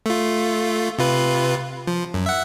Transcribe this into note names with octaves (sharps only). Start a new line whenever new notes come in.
A3 F4
C3 F4 B4
F3
F#2
E5 F#5